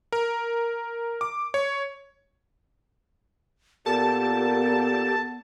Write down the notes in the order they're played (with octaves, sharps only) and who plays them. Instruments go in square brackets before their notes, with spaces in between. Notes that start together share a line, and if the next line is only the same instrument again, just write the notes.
[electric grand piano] A#4
D6
C#5
[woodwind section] A#2 [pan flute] B3 [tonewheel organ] G4 A4 [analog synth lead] A5